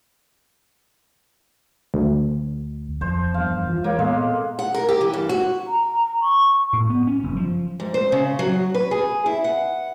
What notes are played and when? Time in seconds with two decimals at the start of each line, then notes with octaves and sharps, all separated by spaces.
1.94 D2
3.01 D1 F2 F3 C5
3.34 E2 G2 F5
3.67 E3 F4
3.84 G#3 A#3 C#5
3.99 A#2 G#3 B3 C4 A4
4.59 F#5
4.74 A#4
4.89 G4
5.01 E3
5.13 G2
5.29 F#4
5.67 A#5
6.22 C#6
6.73 A2
6.89 B3
7.07 C#4
7.24 F#1
7.36 F3
7.80 G#2
7.94 C5
8.12 C#3
8.39 F#3
8.74 B4
8.91 G#4
9.26 E4
9.44 F#5